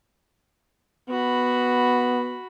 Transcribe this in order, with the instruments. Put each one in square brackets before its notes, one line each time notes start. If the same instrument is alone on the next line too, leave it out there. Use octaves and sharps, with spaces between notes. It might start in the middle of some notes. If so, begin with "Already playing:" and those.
[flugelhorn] B3 [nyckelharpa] F#4 B5